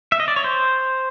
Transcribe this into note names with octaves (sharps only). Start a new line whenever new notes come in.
E5
D#5
D5
C#5
C5